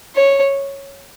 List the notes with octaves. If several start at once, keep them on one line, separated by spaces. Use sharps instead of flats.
C#5